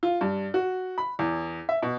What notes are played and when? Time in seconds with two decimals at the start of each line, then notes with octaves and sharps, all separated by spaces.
0.03 F4
0.21 G2
0.54 F#4
0.98 B5
1.19 E2
1.69 E5
1.82 B2